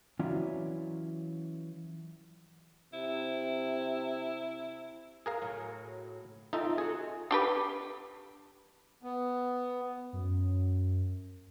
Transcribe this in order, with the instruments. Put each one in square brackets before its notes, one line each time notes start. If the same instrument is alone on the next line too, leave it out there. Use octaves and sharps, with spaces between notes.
[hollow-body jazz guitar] E3 F#3 C#4 E4 F4 D5
[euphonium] C3 [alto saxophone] E4
[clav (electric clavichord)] G#4 A#4 F5
[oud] A2 F#3
[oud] C4 F4 E5 [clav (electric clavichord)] D#4 A4
[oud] F#4 A4 [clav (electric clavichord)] G#4
[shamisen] D4 G4 B4
[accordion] B3
[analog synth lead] F#2